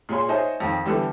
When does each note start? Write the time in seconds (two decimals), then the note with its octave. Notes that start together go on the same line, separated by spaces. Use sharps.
0.09 A#2 G#4 C#5 C6
0.29 D#4 C5 C#5 D#5 E5 G#5
0.60 F2 D#3
0.86 D3 E3 G3 B3 E4 A4